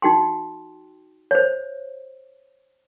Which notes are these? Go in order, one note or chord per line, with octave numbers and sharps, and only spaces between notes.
D#4 F#4 G5 C6
C5 C#5